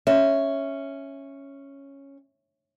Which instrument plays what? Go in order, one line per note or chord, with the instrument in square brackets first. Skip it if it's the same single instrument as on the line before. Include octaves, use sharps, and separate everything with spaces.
[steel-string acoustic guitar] C#4 [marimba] E5